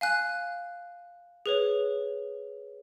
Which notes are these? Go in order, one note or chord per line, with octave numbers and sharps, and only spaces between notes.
F5 G#5 F#6
G#4 B4 C#5